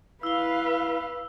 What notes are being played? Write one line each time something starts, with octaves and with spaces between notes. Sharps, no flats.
E4 B4 F5 E6 G7